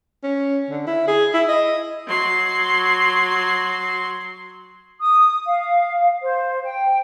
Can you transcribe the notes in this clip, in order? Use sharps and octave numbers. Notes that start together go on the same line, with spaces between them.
C#4
D3
E4
G#4
E4
D#5
F#3 C6
D#6
F5
C5
G5